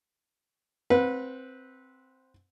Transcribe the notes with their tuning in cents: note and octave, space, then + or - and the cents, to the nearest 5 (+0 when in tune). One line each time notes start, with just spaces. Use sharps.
C4 +0 B4 -10 F#5 -35